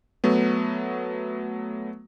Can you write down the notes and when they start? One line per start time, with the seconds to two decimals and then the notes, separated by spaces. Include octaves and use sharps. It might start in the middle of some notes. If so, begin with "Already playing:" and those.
0.24 F#3 A3 B3